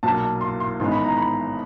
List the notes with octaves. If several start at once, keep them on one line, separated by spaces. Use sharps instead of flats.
B1 A#2 F#3 A#3 A5
C6
C6
A1 G#2 D#3 G#3 B3 C6
B5
A#5
B5